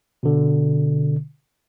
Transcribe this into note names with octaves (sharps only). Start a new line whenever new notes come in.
B2 D3